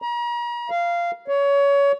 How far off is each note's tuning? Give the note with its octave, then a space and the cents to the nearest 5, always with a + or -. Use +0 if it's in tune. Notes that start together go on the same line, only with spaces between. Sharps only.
A#5 +40
F5 -15
C#5 +20